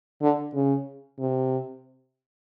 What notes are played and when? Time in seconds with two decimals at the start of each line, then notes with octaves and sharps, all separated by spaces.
0.22 D3
0.55 C#3
1.19 C3